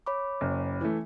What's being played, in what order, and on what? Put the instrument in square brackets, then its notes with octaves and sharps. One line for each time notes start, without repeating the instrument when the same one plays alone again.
[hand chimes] C#5 B5 D6
[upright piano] F#1
E3 A3